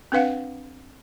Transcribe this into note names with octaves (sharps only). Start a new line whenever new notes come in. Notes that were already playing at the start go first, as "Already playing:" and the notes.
C4 D4 B4 F5 F#5